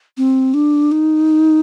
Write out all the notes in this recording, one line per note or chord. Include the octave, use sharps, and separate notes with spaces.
C4
D4
D#4